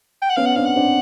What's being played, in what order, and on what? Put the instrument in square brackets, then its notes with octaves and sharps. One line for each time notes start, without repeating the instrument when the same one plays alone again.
[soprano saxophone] G5
F#5
[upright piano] B3 C#4 [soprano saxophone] F5
[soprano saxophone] F#5
[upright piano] C4 D4 [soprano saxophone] F5
[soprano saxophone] F#5
[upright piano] C4 D4